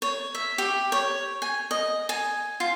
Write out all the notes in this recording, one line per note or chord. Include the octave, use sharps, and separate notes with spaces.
C#5
E5
G4
C#5
G#5
D#5
G#5
F4